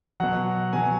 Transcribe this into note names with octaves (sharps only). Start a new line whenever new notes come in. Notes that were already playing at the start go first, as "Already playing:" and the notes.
B2 F#3 F#5
B2 F#3 G#5